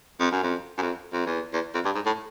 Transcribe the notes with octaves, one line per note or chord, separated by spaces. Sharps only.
F2
F#2
F2
F#2
F2
F2
E2
E2
F2
G2
G#2
A2